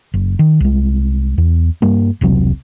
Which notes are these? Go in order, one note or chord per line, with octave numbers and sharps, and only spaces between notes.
F#1
D#3
C2 G#3
E2
G2 G3 A#3
E1 C2 C3 F#3